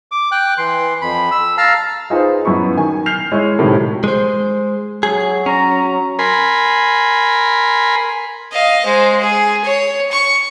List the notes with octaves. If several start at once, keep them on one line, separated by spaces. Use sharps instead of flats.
D6
G5 F#6
E3 C6
F2 B5
E6
F5 A5 A#5 E6 F6
D#4 F4 G#4 B4 C5
F#2 B3 E4 B5 C#6
D#3 G#5
F6 G6 C7 F7
G#3 E4 C#5
A2 C3 D#3 F#3
G#3 C5
F#3 G#4
C#4 A#5
A#4 G#5 B5 C6
D#5 F5
G#3 C5
G#4
C#5
C#6